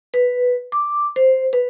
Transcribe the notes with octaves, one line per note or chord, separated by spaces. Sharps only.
B4
D6
C5
B4